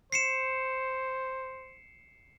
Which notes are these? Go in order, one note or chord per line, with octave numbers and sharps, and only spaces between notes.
C5 C7 C#7 E7